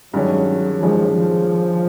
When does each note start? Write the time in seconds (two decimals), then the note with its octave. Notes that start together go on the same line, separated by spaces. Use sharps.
0.13 G2 D#3 F#3 G#3 C#4
0.82 G2 D#3 F3 G#3 C#4
1.17 F3